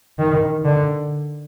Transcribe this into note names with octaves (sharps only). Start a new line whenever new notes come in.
D#3
D3